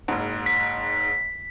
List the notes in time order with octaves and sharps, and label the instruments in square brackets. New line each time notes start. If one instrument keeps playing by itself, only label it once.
[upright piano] F#1 G#2
[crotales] B6